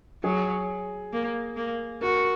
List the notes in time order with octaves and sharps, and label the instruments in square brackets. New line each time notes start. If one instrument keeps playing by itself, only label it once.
[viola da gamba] F#3 [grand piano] G#4
[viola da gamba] A#3
A#3
[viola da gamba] F#4 [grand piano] A#4